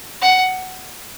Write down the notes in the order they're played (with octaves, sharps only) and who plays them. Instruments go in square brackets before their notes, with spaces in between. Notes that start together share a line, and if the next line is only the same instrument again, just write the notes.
[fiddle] F#5